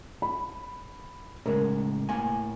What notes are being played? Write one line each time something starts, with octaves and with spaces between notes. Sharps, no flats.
B5
A2 C#3 G#3 A#4
A2 A#3 G#5